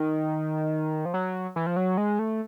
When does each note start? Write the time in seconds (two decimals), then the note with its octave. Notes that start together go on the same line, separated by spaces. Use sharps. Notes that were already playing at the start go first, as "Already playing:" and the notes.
Already playing: D#3
1.05 F3
1.14 F#3
1.56 E3
1.67 F3
1.76 F#3
1.97 G#3
2.19 A3